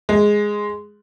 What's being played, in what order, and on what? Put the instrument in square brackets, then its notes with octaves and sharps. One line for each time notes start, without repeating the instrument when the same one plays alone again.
[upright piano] G#3